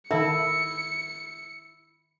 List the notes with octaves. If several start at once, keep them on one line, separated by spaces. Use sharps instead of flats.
D#3 E4 A4 E5 C#7